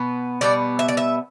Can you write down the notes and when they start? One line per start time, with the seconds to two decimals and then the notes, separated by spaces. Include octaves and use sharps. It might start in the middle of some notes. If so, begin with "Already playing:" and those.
Already playing: B2 B3
0.41 B2 G3 B3 D5
0.79 E5
0.88 D5
0.97 E5